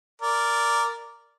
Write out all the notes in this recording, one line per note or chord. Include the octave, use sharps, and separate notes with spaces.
A#4 D5